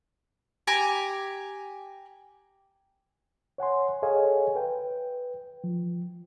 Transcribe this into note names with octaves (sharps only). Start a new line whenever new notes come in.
G4 G#5 A#5
C#5 F#5 G#5 C6
G#4 A4 C#5 D#5 F5 G#5
B4 G5
F3